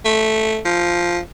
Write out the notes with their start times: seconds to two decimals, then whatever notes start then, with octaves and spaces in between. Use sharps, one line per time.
0.05 A3
0.65 F3